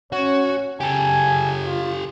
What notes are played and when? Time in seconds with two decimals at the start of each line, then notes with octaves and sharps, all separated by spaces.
0.12 C#4 F#4 C#5
0.80 F#2 C#3 G4 A4 G#5
1.67 F4